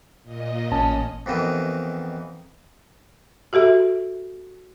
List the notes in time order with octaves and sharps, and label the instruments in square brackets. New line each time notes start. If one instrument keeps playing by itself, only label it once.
[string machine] A#2 D#5
[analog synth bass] A1 [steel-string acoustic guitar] C#4 [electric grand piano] A5
[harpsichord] F2 B2 D#3 E3
[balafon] F#4 G4 A4 E5